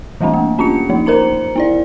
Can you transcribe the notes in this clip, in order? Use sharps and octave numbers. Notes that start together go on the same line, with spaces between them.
E3 G3 A3 C4 D4
A#3
C#4 D4 F4 G4 C#7
F3 A#3 D#4
A#4 C5 A#5 C#7
B3 E4 D5